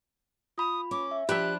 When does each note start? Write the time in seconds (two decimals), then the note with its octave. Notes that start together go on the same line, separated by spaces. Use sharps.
0.58 F4 B5 D#6
0.91 C#4 D6
1.11 E5
1.29 F3 D4 G4 E5 B5 F#6